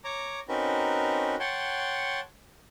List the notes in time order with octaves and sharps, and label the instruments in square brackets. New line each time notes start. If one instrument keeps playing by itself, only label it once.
[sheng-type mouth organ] C#5 A#5 D6
C4 C#4 D#4 F#4 A#4 B4
C#5 F#5 G5 A5 C6